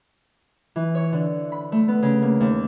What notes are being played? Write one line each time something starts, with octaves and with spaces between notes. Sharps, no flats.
E3
C#5
D3
B5
A3
B3
C#3
A#3
D#2